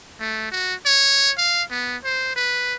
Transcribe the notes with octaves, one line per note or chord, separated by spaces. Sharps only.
A3
F#4
C#5
F5
B3
C5
B4